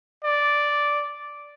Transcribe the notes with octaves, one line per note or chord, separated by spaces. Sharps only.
D5